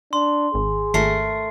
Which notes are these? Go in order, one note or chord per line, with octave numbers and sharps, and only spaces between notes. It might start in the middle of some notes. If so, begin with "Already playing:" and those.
D4 C6
G#1 G#4
G#1 A3 A#4 C7